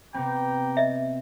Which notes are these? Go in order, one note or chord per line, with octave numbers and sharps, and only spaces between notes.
C3 B3 C4 G4 G5 A#5
D#5 E5